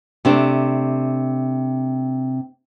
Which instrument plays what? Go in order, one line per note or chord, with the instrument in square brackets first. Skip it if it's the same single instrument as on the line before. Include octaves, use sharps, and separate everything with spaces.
[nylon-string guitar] C3 A3 D4